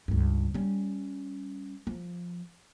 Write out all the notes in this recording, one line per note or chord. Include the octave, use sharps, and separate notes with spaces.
C#2 G2
G3 C#4
F3